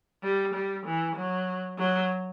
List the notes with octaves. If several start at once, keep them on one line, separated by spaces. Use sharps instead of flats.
G3
G3
E3
F#3
F#3